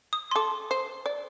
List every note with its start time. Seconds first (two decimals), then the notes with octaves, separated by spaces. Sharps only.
0.13 D#6
0.31 C6
0.36 A4 D6
0.71 C5
1.06 D5